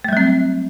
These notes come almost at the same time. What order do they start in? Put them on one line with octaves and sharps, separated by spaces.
A3 G3 F#3 C4